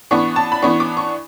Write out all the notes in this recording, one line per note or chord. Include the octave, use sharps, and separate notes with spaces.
E3 B3 D4 C#6
A5
B5
E3 B3 D4 C#6
D6
C#6